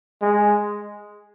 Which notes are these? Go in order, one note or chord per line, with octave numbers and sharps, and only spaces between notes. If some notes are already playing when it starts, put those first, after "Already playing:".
G#3